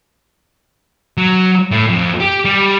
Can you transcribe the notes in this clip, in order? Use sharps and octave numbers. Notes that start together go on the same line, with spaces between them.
F#3
A2
F2
G4
G3